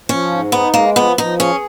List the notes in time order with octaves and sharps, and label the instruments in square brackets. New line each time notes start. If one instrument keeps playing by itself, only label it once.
[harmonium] F3 [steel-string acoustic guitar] C#4
[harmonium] G#2
[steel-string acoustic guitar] B3 [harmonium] D#4
[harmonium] G#3 [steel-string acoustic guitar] A#3
[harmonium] F3 [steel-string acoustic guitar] B3
[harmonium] F3 [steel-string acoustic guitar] D#4
[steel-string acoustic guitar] C#4 [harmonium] G#4